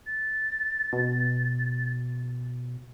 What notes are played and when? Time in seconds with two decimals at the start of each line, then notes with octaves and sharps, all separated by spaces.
0.07 A6
0.93 B2